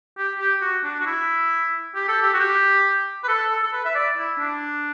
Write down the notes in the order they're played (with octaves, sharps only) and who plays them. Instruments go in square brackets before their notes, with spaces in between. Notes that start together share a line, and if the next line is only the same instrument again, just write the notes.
[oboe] G4
G4
F#4
D4
F#4
E4
G4
A4
G4
F#4
G4
B4
A4
A4
A4
B4
E5
D5
E4
D4